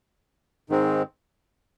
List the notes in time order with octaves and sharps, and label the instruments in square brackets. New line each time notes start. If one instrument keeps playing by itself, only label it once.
[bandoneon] G#2 D#3 G#3 C4